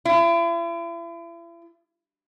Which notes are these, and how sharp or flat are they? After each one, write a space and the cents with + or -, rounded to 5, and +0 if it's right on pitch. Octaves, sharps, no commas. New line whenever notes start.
E4 +40